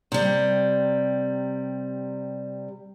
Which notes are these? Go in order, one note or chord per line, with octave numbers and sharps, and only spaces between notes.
C3 G3